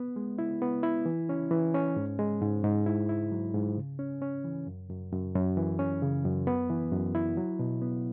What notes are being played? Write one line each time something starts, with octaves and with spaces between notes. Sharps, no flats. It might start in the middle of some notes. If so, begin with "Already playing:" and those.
Already playing: B3
G#3
E4
B3
E4
E3
C#4
E3
C#4
G#2
G#3
G#2
G#2
E4
E4
F#3
G#2
C#3
C#4
C#4
E3
F#2
F#2
F#2
F#2
E3
C#4
C#3
F#2
B3
E3
F#2
E4
F#3
B2
B3